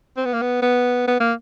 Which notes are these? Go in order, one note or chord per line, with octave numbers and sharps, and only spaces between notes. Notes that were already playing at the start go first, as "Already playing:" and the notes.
C4
B3
A#3
B3
B3
B3
A#3